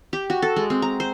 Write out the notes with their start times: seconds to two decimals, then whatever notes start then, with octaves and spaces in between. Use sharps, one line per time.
0.13 G4
0.30 F#4
0.42 A4
0.56 G#3
0.70 C4
0.82 A#5
1.00 C5